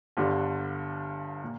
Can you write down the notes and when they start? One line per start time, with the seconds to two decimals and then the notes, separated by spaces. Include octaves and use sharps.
0.17 G1 G2 D3 G3
1.43 A#2